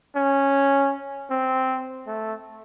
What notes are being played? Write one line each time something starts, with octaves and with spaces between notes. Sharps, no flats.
C#4
C4
A3